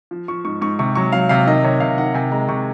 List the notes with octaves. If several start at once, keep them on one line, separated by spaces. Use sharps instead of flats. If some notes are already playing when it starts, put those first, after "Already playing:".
F3
F3 C#6
G#2 C#6
G#2 C#6
C3 C#6
F#3 C#6
F#3 F5
C3 F5
D#3 D#5
C3 C#5
C3 F5
D#3 F#5
C3 G#5
G#3 A#5
C3 C#6